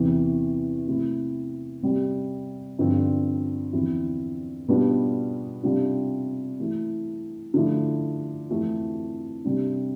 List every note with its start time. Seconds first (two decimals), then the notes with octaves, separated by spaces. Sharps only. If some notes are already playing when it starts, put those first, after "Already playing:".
Already playing: E2 C3 E3
0.88 C3 E3 A3 C4 E4
1.83 C3 G3 C4
2.79 G2 D3 F3 C4
3.73 E2 D3 F3 C4 E4
4.68 B2 G3 B3 D4 F4
5.63 C3 G3 D4 F4
6.60 E3 A3 E4
7.54 D3 F3 A3 E4
8.49 F2 E3 A3 C4 F4
9.44 C3 G3 D4